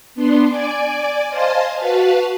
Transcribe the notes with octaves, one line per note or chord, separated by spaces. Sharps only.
B3 D4 C6
D5 G#5 D6
C5 D#5 F5 G#5 A5 C6
F#4 B4 F5 A5